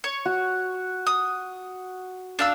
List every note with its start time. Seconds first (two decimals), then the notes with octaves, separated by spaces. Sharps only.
0.04 C#5
0.26 F#4
1.07 D#6
2.39 D4 F5 E6